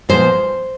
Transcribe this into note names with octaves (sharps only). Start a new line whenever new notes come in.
A#2 F3 G#3 B3 C5